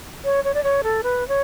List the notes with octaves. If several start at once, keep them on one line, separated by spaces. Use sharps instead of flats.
C#5
C#5
D5
C#5
A4
B4
C#5